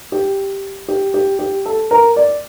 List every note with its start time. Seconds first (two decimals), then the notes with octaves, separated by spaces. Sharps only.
0.12 G4
0.88 G4
1.14 G4
1.39 G4
1.66 A4
1.91 A#4
2.16 D5